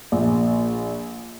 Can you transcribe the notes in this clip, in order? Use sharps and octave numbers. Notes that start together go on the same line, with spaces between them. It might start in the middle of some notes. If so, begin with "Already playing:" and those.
A#1